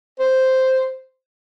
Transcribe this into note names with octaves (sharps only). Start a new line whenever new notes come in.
C5